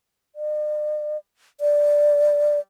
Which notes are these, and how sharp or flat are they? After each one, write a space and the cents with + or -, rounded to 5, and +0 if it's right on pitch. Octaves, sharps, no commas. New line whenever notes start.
D5 +45
D5 +0